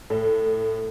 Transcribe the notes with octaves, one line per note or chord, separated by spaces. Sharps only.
A2